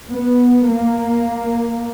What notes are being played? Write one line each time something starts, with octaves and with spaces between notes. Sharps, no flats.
B3
A#3